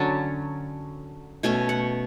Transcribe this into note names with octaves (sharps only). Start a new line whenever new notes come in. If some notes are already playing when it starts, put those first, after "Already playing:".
Already playing: D3 F#3 C#4 A5
B2 A3 C#4 G#5
F#5